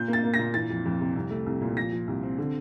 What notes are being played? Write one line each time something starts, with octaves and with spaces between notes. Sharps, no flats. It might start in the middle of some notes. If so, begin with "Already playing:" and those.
Already playing: A#2 G6
A#3
A6
A#3
A#6
A#2
E3 A6
F2
F2
C3
C2
A3
C2
A#2
F3 A#6
F3
C2
C4
D3